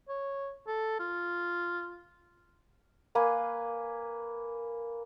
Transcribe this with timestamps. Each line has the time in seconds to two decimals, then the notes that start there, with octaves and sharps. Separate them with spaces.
0.08 C#5
0.67 A4
0.99 F4
3.15 A#3 B4 G#5